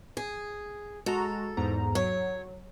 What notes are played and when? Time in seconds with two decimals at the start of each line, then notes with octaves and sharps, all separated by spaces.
0.17 G#4
1.06 G#3 F#4 A4 A#5
1.57 E2 G#2 A#5
1.95 F#3 C#5